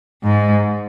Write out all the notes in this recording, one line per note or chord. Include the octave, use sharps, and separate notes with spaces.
G#2